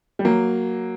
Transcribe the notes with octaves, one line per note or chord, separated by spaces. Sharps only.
G3
F#3 A#3